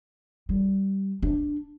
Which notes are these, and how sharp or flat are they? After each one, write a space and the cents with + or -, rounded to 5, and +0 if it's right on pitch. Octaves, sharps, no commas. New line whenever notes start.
G3 -10
D4 +5